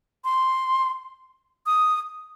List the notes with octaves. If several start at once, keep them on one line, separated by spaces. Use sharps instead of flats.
C6
D#6